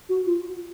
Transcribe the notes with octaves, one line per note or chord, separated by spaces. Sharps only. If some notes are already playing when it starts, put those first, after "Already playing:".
F#4
F4